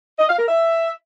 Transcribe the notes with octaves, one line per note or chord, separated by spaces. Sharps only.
D#5
F5
A#4
E5